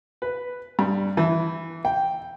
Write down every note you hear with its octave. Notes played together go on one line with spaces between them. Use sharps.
B4
G2
E3
G5